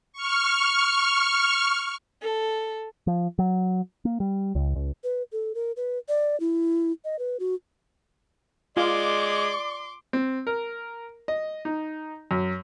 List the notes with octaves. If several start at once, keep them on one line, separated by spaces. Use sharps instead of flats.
C#6 F6
A4
F3
F#3
A#3
G3
C#2
C#2
B4
A4
A#4
B4
D5
E4
D#5
B4
F#4
G#3 F4 D5 C6 D6
C4
A#4
D#5
D#4
F#2